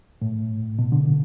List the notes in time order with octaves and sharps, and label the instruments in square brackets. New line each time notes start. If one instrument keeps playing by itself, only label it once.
[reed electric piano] A2
B2
D3